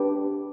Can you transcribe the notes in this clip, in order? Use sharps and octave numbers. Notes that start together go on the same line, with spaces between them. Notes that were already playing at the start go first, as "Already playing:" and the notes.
Already playing: D4 G4 B4